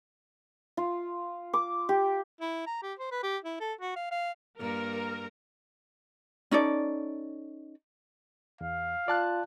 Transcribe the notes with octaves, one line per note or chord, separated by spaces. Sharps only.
F4
D6
G4
E4
A#5
G4
C5
B4
G4
E4
A4
F#4
F5
F5
G2 A#3 A#4
C#4 D#4 A4 D5
E2 F5
F4 D5 A5 F#6